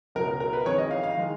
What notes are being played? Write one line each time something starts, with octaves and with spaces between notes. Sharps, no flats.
C#2 B2 F#3 A#4
A#4
A#4
B4
F2 D#3 G#3 C#5
D#5
F5
F5
D#3 G#3